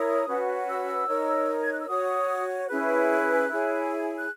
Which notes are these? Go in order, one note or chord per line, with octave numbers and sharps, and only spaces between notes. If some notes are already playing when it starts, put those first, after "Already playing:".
Already playing: E4 A#4 C#5 D#6
C#4 F#4 B4
E6
D#4 A#4 C#5
G#6
F#6
E6
F#4 C#5 D#6
C#4 E4 G#4 B4 F#6
E4 G#4 C#5
F#6